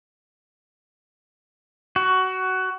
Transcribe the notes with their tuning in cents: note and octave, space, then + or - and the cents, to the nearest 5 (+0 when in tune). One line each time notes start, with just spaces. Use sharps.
F#4 +15